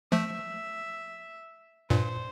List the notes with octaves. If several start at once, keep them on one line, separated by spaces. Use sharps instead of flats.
F3 A3 E5
G2 A#2 C5